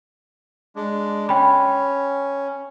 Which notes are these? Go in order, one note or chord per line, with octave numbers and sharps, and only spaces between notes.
G#3 D4
C#4 G5 B5